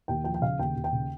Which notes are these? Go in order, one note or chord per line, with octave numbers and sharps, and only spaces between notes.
D#2 G5
F3 G5
G5
C#3 F5
D#2 G5
D#2
G5
C#3